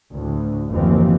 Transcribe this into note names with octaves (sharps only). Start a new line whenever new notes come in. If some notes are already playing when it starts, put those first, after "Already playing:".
D2 A2
F#1 D#2 E3 F3 C4